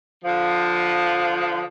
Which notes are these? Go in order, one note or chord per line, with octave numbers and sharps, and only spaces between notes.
D3 F3